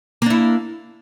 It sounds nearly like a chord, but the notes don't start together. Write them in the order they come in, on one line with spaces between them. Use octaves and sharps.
A#3 D4 E4